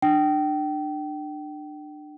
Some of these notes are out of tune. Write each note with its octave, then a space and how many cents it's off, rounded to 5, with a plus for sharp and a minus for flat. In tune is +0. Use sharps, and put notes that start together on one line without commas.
D4 +30 G5 -30